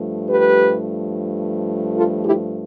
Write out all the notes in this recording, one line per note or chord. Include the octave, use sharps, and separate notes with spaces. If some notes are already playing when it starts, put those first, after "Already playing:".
Already playing: G2 F3 A3
G4 B4
F4 A4
E4 G4